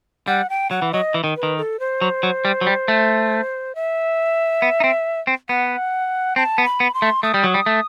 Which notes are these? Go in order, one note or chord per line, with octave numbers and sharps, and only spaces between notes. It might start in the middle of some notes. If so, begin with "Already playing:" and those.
G3 F#5
G5
F#3 F#5
E3
F#3 D#5
E3
D#3
B4
D#3
A4
C5
F#3
F#3
G3
F#3
G3
A3
E5
B3
D#4
C4
C4
B3 F#5
C4 A5
B3
B5
B3
C6
A3
A3 D#6
G3
F#3
G3
A3